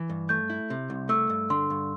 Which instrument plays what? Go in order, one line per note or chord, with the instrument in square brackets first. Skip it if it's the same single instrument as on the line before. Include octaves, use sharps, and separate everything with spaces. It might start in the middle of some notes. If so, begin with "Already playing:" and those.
Already playing: [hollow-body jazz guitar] E3
G2
[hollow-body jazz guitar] A3 [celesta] G6
[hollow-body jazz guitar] E4
C3
C2
[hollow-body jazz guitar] A3 [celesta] E6
[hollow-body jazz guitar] G2
[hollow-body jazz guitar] D3 [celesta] C6
[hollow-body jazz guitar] G2